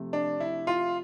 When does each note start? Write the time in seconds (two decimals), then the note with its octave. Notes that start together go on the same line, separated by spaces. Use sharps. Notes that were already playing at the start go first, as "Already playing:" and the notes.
Already playing: C3 F3 A3
0.13 D4
0.40 E4
0.67 F4